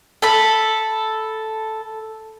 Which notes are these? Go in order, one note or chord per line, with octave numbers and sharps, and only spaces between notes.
A4 B5